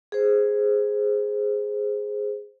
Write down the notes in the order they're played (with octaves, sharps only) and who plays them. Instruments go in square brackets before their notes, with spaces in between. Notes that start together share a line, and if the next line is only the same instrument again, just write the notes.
[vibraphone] G#4 C5